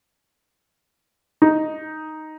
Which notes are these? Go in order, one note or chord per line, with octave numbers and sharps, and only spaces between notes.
D#4